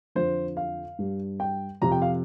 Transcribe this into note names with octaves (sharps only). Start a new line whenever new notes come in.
F2 D3 F3 C5
F5
G2 G3
G5
F2 C3 F3 A#5
G5
F5